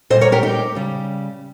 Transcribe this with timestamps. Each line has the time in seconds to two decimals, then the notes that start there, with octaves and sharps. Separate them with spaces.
0.10 A#2 C5 D#5
0.13 G3
0.21 A#4 C#5
0.32 G4 A#4
0.43 D#4 G4
0.75 C#3 G3